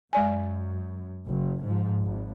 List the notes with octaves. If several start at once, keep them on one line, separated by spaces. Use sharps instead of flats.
F#2 G#3 D5 G#5
F#1
G#2 F3
G#1